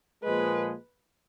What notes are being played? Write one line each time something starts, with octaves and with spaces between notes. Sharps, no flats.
A#2 F3 G#3 B4